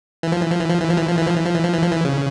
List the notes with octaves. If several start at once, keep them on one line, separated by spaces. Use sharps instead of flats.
E3
F3
E3
F3
E3
F3
E3
F3
E3
F3
E3
F3
E3
F3
E3
F3
E3
F3
E3
C#3